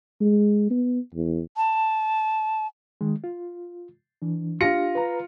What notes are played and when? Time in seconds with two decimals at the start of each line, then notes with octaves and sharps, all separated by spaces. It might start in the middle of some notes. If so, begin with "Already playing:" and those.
0.21 G#3
0.71 B3
1.15 E2
1.56 A5
3.01 D#3 G#3
3.24 F4
4.22 E3 D4
4.60 D4 F4 G4 A#6 C#7
4.95 B4 A#5